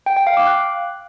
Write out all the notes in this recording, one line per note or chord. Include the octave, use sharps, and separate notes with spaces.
G5
G5
F5
D6
F#6